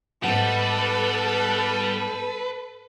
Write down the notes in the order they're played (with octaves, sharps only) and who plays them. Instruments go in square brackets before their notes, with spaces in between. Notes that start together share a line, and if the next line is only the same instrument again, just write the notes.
[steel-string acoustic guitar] G#2 B3 F#5 [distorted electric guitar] G3 G4 [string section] A4 [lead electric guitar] B4